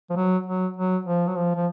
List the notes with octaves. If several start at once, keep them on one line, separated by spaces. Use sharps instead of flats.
F3
F#3
F#3
F#3
F3
F#3
F3
F3